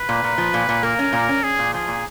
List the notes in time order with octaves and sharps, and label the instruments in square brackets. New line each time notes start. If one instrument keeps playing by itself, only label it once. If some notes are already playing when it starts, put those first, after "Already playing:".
Already playing: [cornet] B4
[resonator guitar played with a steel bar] A#2
A#2
F3
A#2
A#2
[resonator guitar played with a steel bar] A#3 [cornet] A#4
[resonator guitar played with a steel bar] C#4
A#2
C#4
[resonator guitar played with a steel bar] C#4 [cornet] G#4
[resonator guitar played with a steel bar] A#2
[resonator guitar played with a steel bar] F3 [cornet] G#4
[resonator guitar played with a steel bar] A#2